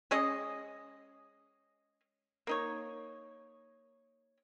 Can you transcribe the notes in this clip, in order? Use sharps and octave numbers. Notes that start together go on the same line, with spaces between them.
G#3 C#4 G#4 D#5
A#3 D#4 C#5